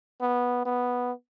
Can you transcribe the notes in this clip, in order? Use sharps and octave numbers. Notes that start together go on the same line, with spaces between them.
B3
B3